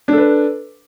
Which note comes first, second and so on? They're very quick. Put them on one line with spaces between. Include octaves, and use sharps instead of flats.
D4 A4 B4